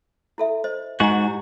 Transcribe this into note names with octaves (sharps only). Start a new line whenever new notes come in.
E4 A4 E5
C5 D#5
G#2 F#4 G#5 A#5
E4 G4